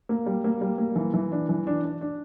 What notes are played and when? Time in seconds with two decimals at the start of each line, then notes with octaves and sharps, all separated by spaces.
0.09 A#3
0.26 G3
0.44 A#3
0.61 G3
0.78 A#3
0.96 E3
1.14 E3
1.32 D4
1.49 E3
1.67 D4
1.84 D4
2.01 D4